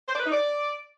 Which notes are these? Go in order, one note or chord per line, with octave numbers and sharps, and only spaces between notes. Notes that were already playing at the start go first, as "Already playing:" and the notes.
C5
D5
B4
D#4
D5